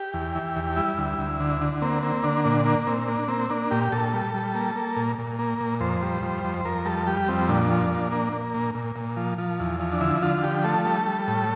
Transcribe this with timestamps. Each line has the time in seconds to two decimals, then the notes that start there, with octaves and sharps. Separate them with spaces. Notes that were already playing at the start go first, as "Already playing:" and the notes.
Already playing: G4
0.14 E2
0.35 E3
0.56 E2
0.76 G3 E4
0.98 D2
1.18 D2
1.40 D3
1.61 D3
1.82 A#3 C4
2.03 A#3 C4
2.23 D3 D4
2.44 A#2 D4
2.65 A#3 D4
2.87 A#2 C4
3.08 A#3 D4
3.28 A#3 C4
3.50 A#3 D4
3.71 A#2 G4
3.92 A#2 A4
4.13 G3
4.34 G3
4.55 A#3
4.76 A#3
4.96 A#2
5.18 A#2
5.39 A#3
5.61 A#2
5.80 F2 C5
6.02 G3
6.23 F2
6.44 F2
6.65 F2 A#4
6.85 G3 A4
7.07 G3 G4
7.28 F2 C4
7.49 A#2 D4
7.71 F3
7.91 A#2
8.12 A#3
8.33 A#3
8.54 A#2
8.75 A#2
8.96 A#2
9.17 F3
9.38 F3
9.60 E2
9.80 F3
9.92 D4
10.01 D3 E4
10.23 D3 F4
10.43 F3 G4
10.64 A3 A4
10.85 G3 A4
11.07 G3
11.28 A2